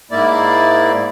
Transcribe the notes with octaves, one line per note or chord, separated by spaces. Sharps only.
G#2 A#3 E4 D5